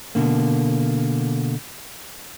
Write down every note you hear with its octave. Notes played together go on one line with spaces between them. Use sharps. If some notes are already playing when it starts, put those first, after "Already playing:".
B2 D3 A#3